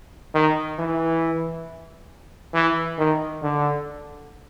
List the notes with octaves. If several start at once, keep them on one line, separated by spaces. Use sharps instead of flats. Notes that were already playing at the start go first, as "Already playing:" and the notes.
D#3
E3
E3
D#3
D3